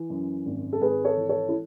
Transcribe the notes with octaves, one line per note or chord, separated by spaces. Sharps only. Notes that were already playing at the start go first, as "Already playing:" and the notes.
Already playing: E3
F#2
G#1
A4
G#1 G#4 B4
A4 C#5
E3
A4 C#5
E4